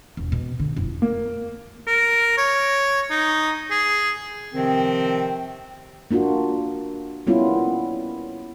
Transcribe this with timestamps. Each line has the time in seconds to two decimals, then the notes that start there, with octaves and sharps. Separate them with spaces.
0.17 E1
0.32 B2
0.60 D3
0.77 F1 E4
1.02 A#3
1.87 A#4
2.37 C#5
3.10 D#4
3.71 G#4
4.54 C3 D#3 F3 C4
6.11 A#3 D4 F4 F#4
7.27 G3 A#3 B3 C#4 E4 F4